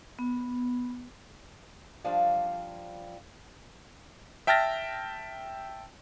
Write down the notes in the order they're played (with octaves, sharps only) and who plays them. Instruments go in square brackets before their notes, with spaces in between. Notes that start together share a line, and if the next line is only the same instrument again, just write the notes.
[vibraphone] B3
[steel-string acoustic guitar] F3 G3 D4 F5
[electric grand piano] E5 G5 A5 F6 A6 A#6